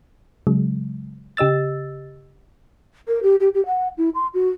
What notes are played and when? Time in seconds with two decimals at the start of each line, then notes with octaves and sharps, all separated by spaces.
0.47 C#3 F#3 G#3
1.37 C#3 G4 D#5 E6 A6
3.08 A#4
3.23 G4
3.40 G4
3.54 G4
3.66 F#5
3.98 E4
4.15 C6
4.34 F#4